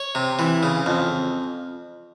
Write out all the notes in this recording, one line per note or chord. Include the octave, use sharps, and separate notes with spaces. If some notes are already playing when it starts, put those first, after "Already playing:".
Already playing: C#5
C3
E3
C#3
F2